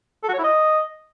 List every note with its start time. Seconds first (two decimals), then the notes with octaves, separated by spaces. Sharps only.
0.23 A4
0.28 F#4
0.34 C#5
0.39 E4
0.44 D#5